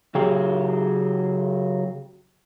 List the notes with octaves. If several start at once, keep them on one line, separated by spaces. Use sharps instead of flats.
C#3 F#3 G4 G#4